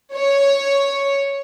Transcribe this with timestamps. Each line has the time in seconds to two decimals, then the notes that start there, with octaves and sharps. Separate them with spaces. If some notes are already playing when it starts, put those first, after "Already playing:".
0.13 C#5